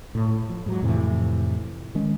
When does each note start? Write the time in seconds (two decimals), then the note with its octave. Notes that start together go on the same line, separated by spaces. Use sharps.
0.15 A2
0.49 F3
0.66 G#2 F#3
0.82 F2 A2 C3 E3
1.95 D#3 G#3 C#4